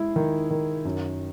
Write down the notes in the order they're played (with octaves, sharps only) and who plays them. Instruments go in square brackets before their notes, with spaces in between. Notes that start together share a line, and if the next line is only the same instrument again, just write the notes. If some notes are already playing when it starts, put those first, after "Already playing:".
Already playing: [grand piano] G#3 E4
D#3
D#3
F#2